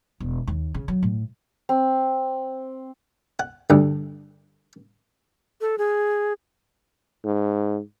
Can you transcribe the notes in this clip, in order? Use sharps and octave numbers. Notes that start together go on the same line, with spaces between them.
E1
D#2
C#3
F#3
A2
C4
F#5
D2 G2
A4
G#4
G#2